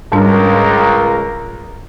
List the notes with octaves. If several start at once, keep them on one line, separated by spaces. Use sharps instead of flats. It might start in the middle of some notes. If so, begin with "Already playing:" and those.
C#2 G#2 G3 D4 A#4